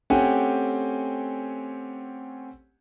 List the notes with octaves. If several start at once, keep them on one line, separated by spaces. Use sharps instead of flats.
A3 C4 C#4 G4 F#5 G#5